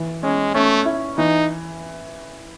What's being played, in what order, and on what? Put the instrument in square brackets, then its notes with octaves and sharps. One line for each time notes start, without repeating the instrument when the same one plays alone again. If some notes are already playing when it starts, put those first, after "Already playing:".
Already playing: [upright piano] E3
[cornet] G#3 [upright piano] C#4
[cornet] A3 [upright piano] C#4
[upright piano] E4
[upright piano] E3 [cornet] D#4